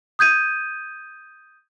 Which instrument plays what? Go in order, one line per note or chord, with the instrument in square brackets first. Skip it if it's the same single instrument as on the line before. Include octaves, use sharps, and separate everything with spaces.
[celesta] D#6 G6 G#6 D#7